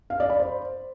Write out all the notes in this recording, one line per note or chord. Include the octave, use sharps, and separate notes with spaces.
F5
D5
B5
C5